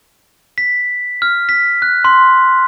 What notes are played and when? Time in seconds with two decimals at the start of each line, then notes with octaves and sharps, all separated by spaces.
0.58 B6
1.22 F6
1.49 B6
1.82 F#6
2.05 C6